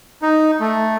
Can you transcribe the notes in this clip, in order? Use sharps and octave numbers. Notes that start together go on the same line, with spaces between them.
D#4
A3